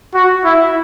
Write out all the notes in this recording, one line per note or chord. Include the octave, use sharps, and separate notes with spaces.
F#4
E4